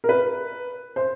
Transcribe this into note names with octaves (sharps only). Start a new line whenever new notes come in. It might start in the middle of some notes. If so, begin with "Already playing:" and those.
A#4
B4
C5